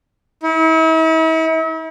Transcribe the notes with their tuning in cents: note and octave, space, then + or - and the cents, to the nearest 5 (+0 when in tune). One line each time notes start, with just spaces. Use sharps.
E4 -45